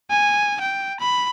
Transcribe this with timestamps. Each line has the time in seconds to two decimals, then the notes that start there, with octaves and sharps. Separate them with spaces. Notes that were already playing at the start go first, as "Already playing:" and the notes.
0.11 G#5
0.61 G5
1.00 B5